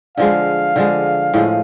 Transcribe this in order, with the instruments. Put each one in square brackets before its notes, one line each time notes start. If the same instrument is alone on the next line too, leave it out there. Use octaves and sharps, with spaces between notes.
[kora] D3 F3 G#3 [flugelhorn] F5
[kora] D3 F3 G#3
A2 F3 G#3